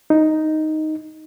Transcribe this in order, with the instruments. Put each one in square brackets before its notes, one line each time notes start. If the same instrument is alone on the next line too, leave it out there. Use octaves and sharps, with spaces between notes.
[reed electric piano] D#4